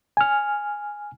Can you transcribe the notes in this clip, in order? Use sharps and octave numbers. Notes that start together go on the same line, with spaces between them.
G#5 F6